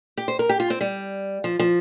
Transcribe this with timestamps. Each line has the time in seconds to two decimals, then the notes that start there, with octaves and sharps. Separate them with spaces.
0.17 G4
0.28 C5
0.39 A#4
0.49 G4
0.60 F4
0.70 C4
0.81 G3
1.44 F3
1.60 F3